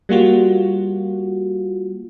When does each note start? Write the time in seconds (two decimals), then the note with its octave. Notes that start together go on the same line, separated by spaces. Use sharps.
0.09 G3 A#3 F4 F#4